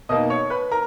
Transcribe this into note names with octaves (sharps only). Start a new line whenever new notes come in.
B2 A#3 D#4 D#5 D#6
C#5 C#6
B4 B5
A#4 A#5